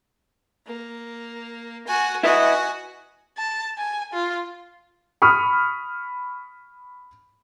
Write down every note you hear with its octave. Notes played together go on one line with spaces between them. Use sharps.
A#3
F#4 G#5
E4 F#4 B4 D#5 G#5
A5
G#5
F4
B5 C#6 D#6 F6